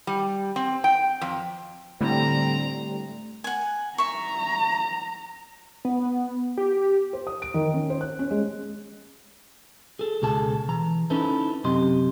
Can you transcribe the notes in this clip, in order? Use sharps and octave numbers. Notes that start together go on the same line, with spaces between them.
G3
C4
G5
F2
A2 D3 G3 A3 C4 A#5
F#5 G#5
E5 A#5 C#6
B3
G4
C5
D#6
D7
D#3
C#4
C5
F#6
C#4
G#3
G#4 A4
C#2 B2 G#4 A4 A5
E3 A#5
C#4 D#4 E4 A4 B4 C5
F#2 C3 G4 D#5 C6